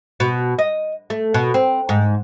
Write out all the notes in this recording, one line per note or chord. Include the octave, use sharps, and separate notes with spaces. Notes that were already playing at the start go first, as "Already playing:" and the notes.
B2
D#5
A3
B2
C4
G#2